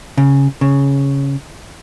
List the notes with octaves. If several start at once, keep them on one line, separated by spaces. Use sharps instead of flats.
C#3
C#3